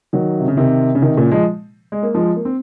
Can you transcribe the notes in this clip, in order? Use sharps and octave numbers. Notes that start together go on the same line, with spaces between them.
D#3 F#3
C3
C#3
C3 D#3
C#3
C3 D#3
A#2 C#3
F3 G#3
G#3
A#3
F3 G#3
A#3
C4